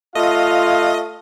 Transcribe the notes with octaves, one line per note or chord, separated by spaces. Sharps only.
A3 F4 D#5 F5